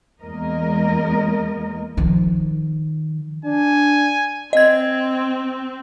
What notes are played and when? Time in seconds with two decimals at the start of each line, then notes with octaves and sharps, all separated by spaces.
0.23 E2 G#3 A#3 A#4 D#5
1.97 D#3 F3
3.45 D4 G#5
4.53 C4 D#5 G#6